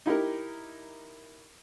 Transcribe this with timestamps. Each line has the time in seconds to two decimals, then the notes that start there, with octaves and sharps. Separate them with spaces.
0.06 D#4 E4 G4 A#4